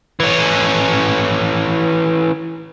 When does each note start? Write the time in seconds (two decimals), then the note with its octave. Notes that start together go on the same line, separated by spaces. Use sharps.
0.20 E3 C#4